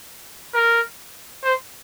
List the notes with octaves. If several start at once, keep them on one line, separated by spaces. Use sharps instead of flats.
A#4
C5